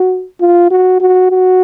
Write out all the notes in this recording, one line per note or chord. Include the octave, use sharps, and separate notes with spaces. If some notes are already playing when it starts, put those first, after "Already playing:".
Already playing: F#4
F4
F#4
F#4
F#4